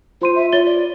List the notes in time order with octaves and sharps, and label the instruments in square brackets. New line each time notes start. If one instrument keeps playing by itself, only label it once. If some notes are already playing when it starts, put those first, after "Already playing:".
[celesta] F4 C6 D#7 [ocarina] C5
[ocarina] E5
[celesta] F4 A6 G7 [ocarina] C#5
[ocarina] D5